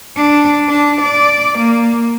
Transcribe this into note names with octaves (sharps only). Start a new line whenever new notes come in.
D4
D4
D5
A#3